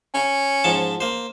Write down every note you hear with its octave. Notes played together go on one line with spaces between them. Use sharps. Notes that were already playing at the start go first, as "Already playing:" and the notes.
C#4
G#2 F3 A5
A#3 C5